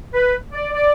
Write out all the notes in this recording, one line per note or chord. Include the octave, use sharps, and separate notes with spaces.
B4
D5
D5